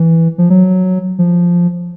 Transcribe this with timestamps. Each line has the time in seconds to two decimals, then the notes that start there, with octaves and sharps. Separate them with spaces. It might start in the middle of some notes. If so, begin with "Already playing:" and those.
Already playing: E3
0.38 F3
0.50 F#3
1.19 F3